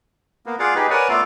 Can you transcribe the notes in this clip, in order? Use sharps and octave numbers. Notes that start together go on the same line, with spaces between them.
A#3 B3
F4 G#4 D5 F5 F#5
D#4 G4 G#4 B4
A#4 B4 C#5 D5 F#5 G#5
A3 B3 F4 A4 D5 F5